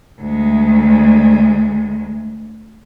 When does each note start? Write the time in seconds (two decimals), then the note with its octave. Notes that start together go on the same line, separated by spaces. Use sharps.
0.21 D2 G#3